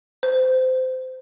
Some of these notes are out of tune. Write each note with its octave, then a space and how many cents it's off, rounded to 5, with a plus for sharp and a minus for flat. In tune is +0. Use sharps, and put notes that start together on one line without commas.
C5 -25